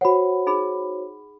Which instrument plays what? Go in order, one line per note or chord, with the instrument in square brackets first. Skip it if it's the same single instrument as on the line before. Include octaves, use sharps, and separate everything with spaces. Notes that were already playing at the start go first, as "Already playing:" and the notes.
[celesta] F#4 C5 C#5 [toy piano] F#5 B5
[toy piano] D#4 G#4 B5